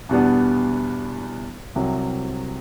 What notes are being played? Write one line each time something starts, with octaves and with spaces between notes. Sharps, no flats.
E2 B2 G3 B3 D4
C2 C3 F#3